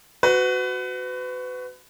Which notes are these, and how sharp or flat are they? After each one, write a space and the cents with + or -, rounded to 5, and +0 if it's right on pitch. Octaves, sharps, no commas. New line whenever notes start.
F#4 +0 B4 +30